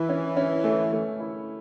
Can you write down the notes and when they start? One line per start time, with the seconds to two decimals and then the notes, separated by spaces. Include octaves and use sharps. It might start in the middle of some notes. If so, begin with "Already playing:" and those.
Already playing: E3 E4
0.09 C#4
0.36 C#4
0.64 A3
0.93 A3
1.20 E4